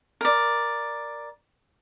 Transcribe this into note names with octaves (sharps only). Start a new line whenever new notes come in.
A#4 D5